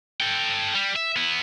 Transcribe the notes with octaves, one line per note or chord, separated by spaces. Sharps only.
A4 G5
G3
E5
B3 E4